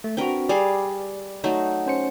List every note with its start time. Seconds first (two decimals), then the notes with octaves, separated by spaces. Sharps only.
0.04 A3
0.17 C4 D4 F#4 A#4 B4 G5
0.49 G3 G#4 D5 F5
1.44 F#3 A3 D#4
1.86 C#4 C5 C#7